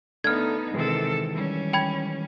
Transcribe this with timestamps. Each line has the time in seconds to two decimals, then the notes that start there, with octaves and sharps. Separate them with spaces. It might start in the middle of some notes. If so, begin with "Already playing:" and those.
0.24 A3 B3 D4 D#4 A4 F6 G#6
0.74 C3 D#3 E3 G#3 A4
1.31 G3 C#4
1.73 G5 B5 G#6